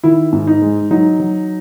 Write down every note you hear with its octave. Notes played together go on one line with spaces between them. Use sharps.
D#3 E4
G#2
D#4
G#3
F#3 D#4
F#3